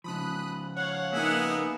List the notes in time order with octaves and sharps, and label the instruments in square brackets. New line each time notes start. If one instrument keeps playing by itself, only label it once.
[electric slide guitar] C#3 F3 [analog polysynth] B5 D#6 F#6
[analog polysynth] C#5 F5 [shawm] F#5
[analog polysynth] A#3 D#4 [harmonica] B3 G#4 E5